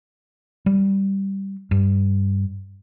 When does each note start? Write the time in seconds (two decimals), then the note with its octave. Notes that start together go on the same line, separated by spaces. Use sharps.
0.66 G3
1.71 G2